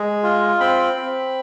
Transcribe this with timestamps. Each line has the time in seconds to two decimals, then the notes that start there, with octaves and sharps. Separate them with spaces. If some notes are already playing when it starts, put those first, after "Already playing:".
Already playing: G#3
0.23 F4
0.60 C4 B5
0.97 C4